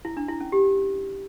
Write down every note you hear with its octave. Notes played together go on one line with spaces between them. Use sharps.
E4
D4
E4
C#4
G4